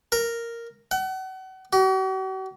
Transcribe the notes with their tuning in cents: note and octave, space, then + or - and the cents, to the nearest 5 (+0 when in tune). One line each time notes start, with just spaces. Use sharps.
A#4 -5
F#5 +35
F#4 +45